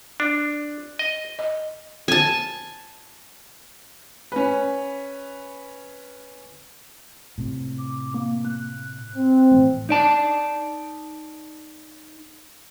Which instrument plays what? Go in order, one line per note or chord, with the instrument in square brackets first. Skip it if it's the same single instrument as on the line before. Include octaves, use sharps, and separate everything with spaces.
[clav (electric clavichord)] D4
D#5
[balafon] D#5
[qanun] G#5 A5
[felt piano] C#4 B4
[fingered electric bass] A2 C3
[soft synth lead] D6
A#3
F#6
[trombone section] C4
[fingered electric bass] A2 E3 A3
[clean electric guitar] D#4 D5 A5